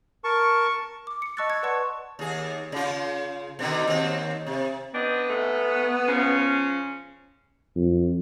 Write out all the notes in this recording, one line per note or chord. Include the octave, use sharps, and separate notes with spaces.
A#4 A5 C#6
D6
C#7
D#5 A5 C#6 E6 F#6 A6
G#6 C#7
B4 D5 F#5 A5 C6 C#6
D#2 G#4
C#3 F4
B2 D3 D#3
D#2 C4
C3
B3 C4 D4 D#5
G#2 A3
C#3 F3 C#4
F2